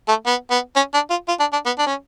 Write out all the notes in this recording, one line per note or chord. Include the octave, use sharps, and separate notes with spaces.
A3
B3
B3
C#4
D4
F4
F4
D4
D4
B3
D4
C#4